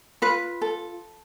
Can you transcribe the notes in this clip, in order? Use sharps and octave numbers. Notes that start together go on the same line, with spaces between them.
F4 B4
A4